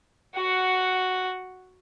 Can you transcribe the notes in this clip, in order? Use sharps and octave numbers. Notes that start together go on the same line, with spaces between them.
F#4 F#5